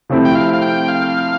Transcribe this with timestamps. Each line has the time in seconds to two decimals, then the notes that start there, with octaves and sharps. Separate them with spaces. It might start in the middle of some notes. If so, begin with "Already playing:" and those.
0.09 C3 F3 A3 C4 E4
0.25 G5
0.35 F5
0.53 F5
0.62 G5
0.88 F5